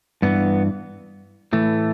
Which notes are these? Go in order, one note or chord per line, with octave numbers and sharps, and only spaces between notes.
G2 E3 B3
A2 E3 A3